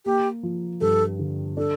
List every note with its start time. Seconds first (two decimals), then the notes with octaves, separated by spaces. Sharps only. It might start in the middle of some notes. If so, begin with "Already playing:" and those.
0.05 A#3 G4
0.43 F3
0.81 G2 A4
1.19 D3
1.57 D4 A4